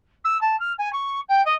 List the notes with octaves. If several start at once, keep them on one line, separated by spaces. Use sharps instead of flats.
E6
A5
F6
G#5
C#6
G5
D#5